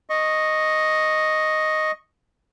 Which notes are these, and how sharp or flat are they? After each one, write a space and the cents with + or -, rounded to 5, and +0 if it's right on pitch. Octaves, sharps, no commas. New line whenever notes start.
D#5 +0 C#6 -10